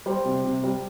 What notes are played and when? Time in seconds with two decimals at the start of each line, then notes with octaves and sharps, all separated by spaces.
0.06 G3 C5
0.25 C3
0.44 C3
0.64 G3